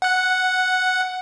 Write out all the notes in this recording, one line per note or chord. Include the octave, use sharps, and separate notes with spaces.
F#5 F#6